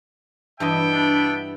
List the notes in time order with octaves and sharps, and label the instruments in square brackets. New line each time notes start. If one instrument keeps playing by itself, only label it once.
[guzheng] G2 E3 D#5 [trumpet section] B3 E5 G5
[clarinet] D4